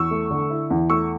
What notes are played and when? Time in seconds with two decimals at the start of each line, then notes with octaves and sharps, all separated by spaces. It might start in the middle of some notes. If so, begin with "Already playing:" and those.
Already playing: E2 C#6 E6
0.11 A3
0.31 D3
0.50 E4
0.70 E2
0.90 A3 C#6 E6